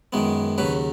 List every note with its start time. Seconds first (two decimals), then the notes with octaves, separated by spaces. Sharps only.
0.13 F#2 D#3 G#3 B3
0.58 D#2 C#3 F#3 B4